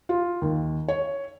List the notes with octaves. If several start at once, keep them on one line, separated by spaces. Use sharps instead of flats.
F4
D#2
C#5